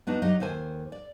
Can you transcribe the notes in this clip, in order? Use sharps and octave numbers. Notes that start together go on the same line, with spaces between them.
B3 D4 D#4 F#4
F#3 D#4 G4 D#5
D#2 A4 C5 G#5
D5